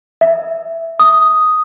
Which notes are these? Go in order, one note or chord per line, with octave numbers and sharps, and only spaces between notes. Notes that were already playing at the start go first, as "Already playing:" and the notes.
E5
D#6